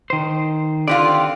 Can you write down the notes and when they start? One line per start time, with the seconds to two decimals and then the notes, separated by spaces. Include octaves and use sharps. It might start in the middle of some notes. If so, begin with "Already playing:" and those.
0.10 D#3 C5
0.88 D3 C4 F4 G4 D5